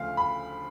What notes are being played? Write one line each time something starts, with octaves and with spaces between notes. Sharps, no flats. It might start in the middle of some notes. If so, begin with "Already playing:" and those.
Already playing: D2 C#3 F3 A3 F5
B5